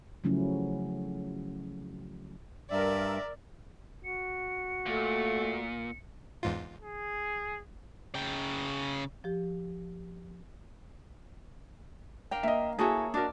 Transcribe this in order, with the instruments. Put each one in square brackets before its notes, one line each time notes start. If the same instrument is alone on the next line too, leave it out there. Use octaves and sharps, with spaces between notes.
[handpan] C#3 F3 F#3 A3 C#4 E4
[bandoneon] G2 [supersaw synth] A#4 E5 [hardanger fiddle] D5
[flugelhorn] F#4 [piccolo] C#7
[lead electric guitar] A#2 [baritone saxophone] A3
[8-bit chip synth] E2 G#2 F4
[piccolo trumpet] G#4
[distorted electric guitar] C#3 G5
[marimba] F3 G4
[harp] D4 A#4 F5 [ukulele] G5
[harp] A#3 [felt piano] D#5 E5
[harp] A#3 C#5 E5 [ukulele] E4 F#4 A4 [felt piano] G#4 G#5
[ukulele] D4 F#4 A#4 [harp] D#4 D5